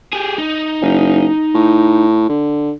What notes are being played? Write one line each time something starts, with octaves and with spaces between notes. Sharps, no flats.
G4 G#4
D#4
F#1
A2
D3